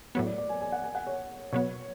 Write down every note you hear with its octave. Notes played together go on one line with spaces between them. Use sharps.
A2 F#3 B3 C#5
D5
D5
G#5
G#5
F#5
G#5
F#5
C#5
B2 F#3 B3 C#5